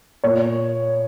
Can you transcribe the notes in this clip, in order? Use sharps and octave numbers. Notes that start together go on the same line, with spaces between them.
A#2 A#3 C#5